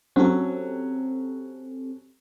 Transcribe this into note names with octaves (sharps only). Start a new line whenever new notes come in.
F#3 C4 C#4 G4 A4